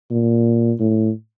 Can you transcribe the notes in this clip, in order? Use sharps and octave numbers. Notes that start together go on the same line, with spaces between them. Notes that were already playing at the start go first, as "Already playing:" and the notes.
A#2
A2